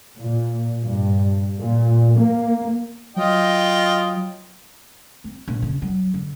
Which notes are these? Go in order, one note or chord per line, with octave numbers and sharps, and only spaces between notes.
A#2
G2
A#2
A#3
F#3 F4 D#5 G5
C4
A#1
C#3
F#3
D3